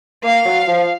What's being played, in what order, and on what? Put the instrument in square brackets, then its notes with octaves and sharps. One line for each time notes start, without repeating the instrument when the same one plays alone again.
[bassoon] A#3 [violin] F5
[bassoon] F#3
F3